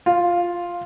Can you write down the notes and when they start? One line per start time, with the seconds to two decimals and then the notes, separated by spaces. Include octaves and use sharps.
0.06 F4